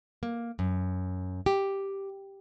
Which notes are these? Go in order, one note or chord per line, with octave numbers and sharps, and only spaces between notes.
A#3
F#2
G4